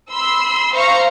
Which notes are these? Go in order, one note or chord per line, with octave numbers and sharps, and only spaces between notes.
B5 C6 E6
C5 F5 A#5 C#6